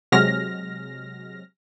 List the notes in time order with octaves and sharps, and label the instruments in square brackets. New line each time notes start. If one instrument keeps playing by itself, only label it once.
[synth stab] C3 F#3 G#3 F6 A#6